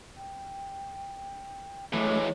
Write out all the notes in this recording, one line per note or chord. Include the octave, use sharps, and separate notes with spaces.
G5
E3 F#3 G#3 A3 D6